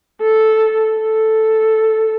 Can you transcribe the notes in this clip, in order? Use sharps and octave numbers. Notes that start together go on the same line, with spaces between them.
A4
A4